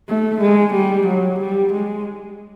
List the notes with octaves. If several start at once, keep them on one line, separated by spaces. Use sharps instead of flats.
A3
G#3
G3
F#3
G3
G#3